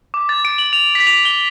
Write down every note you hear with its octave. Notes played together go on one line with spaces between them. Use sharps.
D6
A6
D7
F#7
F7
B6
F7
G7